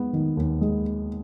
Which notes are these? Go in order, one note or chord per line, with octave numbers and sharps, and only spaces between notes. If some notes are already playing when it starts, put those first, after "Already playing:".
Already playing: G#3 B3
D#3
D#2
G#3